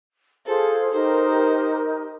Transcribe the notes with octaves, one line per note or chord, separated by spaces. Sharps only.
F4 G#4 A4 C5
D#4 G4 A#4 C5